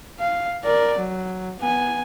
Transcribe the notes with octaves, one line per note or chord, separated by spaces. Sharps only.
F5
A#4 D5
F#3
B3 G#5